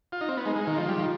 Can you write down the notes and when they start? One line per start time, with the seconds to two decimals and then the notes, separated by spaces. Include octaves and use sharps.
0.12 F4
0.21 D#4
0.29 C4
0.37 B3
0.44 G#3 D#4
0.56 G#3
0.61 D#4
0.67 D#3
0.77 F3 F4
0.88 G3
1.00 D#3